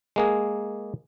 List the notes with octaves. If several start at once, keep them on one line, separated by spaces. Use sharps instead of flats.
G#3 A#3 G#4